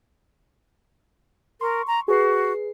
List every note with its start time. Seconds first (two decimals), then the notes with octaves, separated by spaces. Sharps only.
1.61 A#4 C6 C#6
1.87 A#5
2.08 F#4 G#4 B4 C7